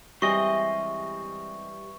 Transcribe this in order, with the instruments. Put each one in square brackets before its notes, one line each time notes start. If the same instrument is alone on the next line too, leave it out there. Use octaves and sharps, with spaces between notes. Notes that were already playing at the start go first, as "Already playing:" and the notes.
[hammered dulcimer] E3 [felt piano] G3 [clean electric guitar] G#3 C4 D#5 [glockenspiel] C#6